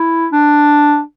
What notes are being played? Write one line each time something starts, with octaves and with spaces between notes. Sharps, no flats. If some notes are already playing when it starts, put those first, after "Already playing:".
Already playing: E4
D4